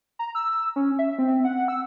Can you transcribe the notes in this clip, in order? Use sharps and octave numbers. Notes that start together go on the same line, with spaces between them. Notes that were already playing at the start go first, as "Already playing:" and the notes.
A#5
E6
C#4
E5
C4
F#5
E6